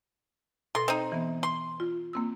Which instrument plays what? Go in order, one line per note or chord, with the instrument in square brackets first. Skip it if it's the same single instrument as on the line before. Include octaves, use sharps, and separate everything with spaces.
[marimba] B2 A4 A#6 [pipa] C6
[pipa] C4 D#4 [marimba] D#5
[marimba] E3 B3
[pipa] C6
[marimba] F4
A#3 C4 E6